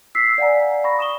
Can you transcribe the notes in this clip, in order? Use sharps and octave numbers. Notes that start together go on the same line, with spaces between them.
E6 B6 C7
D5 F5 F#5 G#5 A#5
B5 C#6 A#6
D#6 E7 G7